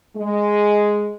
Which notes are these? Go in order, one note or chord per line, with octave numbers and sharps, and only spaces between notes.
G#3